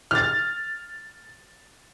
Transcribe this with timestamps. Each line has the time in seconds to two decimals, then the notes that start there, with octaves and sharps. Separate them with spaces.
0.11 F6 A6